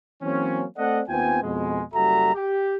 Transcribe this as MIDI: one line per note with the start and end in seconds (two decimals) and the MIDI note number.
0.22 0.64 52
0.22 0.64 54
0.22 0.64 58
0.22 0.64 60
0.22 0.64 61
0.77 1.02 57
0.77 1.02 60
0.77 1.02 69
0.77 1.02 74
0.77 1.02 75
0.77 1.02 78
1.08 1.39 39
1.08 1.39 59
1.08 1.39 60
1.08 1.39 65
1.08 1.39 79
1.08 1.39 80
1.43 1.83 41
1.43 1.83 47
1.43 1.83 56
1.94 2.32 30
1.94 2.32 55
1.94 2.32 66
1.94 2.32 69
1.94 2.32 76
1.94 2.32 82
2.34 2.77 67